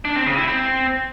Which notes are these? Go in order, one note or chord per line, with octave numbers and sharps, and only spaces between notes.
D4
C4
C#3
E4
C4